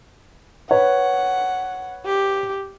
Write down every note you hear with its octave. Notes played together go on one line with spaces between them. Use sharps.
B4 C#5 F#5
G4